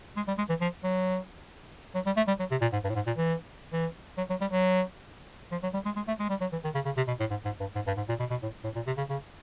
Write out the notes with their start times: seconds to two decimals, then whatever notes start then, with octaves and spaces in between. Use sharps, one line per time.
0.16 G#3
0.28 G3
0.38 G#3
0.49 E3
0.61 F3
0.84 F#3
1.95 F#3
2.06 G3
2.17 A3
2.28 G3
2.39 F#3
2.51 C3
2.61 A#2
2.72 G#2
2.84 G2
2.89 A2
2.95 G#2
3.06 A#2
3.17 E3
3.73 E3
4.18 F#3
4.30 F#3
4.41 G3
4.51 F#3
5.51 F3
5.63 F#3
5.74 G3
5.85 G#3
5.96 G#3
6.08 A3
6.19 G#3
6.29 G3
6.41 F#3
6.52 E3
6.64 D#3
6.75 C#3
6.85 C#3
6.97 C3
7.07 B2
7.20 A2
7.30 G#2
7.45 G#2
7.60 G2
7.75 G#2
7.87 G2
7.97 G#2
8.09 A#2
8.19 B2
8.30 B2
8.43 A2
8.64 A2
8.75 A#2
8.87 C3
8.97 C#3
9.10 C#3